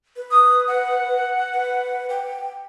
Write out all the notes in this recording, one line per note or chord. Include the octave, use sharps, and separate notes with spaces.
B4
D#6
F#5
B4
G5